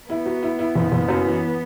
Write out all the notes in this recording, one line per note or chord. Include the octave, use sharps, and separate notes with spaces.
B3 E4
F#3
E4
E4
F#1
F#1
F#2
E3